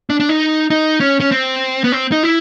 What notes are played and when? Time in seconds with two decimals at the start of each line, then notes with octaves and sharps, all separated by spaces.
0.10 D4
0.20 D4
0.29 D#4
0.70 D#4
1.00 C#4
1.20 C#4
1.31 C4
1.84 B3
1.92 C4
2.12 D#4
2.23 E4